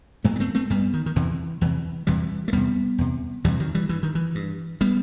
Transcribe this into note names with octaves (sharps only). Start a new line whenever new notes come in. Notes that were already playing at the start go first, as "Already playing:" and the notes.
G2 F#3 A3
B3
A3 C4
A3 C4
G2 G3 B3
D#3
D#3
E2 C3 E3
E2 C3 E3
E2 C3 E3 G3
A3
E2 C3 G3 B3
E2 C3
E2 C3 E3 G3
D#3 F#3
E3 G3
G2 E3
D#3
E3
G2
G3 B3